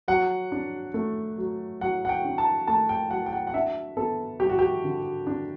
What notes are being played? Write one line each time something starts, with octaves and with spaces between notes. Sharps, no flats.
F#3 F#5
D4
A3
F#3
F#3 F#5
F#5
G5
D4
A5
A3 A5
G5
F#3 F#5
G5
F#5
F#5
D4 E5
B3 A4
G3 G4
F#4
G4
D3
D4